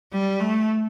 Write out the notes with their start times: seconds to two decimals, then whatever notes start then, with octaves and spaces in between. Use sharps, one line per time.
0.12 G3
0.40 A3